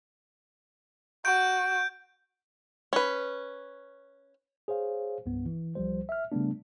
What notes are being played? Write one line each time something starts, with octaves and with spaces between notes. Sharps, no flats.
F#4 G6 D7
C#4 B4
G#4 C5 C#5 F5
C2 G2 B3
E3
C2 F3 G3 C5
E5 F6
C#3 G3 A3 B3 D4